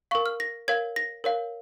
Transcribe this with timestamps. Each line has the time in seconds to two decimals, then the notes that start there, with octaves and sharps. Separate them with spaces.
0.11 A#4 F5 C#6
0.26 F6
0.40 A#6
0.68 A#4 C#5 F5 G#6
0.96 A#6
1.24 A#4 C#5 F5